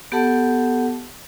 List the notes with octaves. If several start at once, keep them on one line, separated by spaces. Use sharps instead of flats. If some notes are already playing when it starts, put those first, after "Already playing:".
B3 G4 A4 F#5 A5